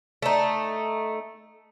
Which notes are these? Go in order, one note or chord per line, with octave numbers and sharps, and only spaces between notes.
A3 D#4